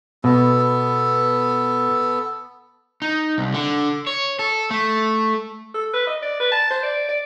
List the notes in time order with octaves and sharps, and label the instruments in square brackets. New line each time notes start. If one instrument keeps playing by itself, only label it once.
[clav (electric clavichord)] B2 [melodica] B3 A4
[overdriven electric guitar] D#4
C2
D3
C#5
A4
A3
[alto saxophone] A4
B4
D#5
D5
B4
A5
C5
D5
D5